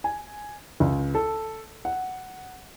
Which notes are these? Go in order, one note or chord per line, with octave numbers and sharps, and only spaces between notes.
G#5
C#2
A4
F#5